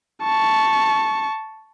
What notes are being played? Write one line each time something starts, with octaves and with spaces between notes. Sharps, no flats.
A5 C#6